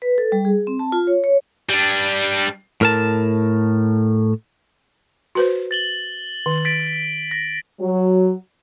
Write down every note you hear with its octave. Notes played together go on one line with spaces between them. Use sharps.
B4
A4
G3
G#4
C4
A5
F4
C#5
C#5
G3 D4
A2 A#4 A5
F#4 B4 C5
A6 F#7 G7
D#3
A6 B6 D7
A#6
F#3